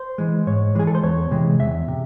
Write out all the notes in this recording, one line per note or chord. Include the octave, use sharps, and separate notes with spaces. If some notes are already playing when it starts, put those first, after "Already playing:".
Already playing: C5
E3 G#3
G#2 C#5
E3 G#3 G#4
A4
C5
E2 C#5
C3 E3 G#3
E2 E5
C3